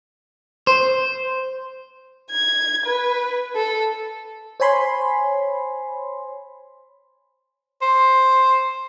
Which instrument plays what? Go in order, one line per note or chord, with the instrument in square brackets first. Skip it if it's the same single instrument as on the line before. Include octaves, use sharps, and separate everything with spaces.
[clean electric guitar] C5
[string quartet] G#6
B4
A4
[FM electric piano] C5 C#5 G#5 B5 C6
[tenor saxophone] C5